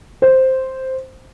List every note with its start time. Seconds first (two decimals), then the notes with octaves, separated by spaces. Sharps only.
0.22 C5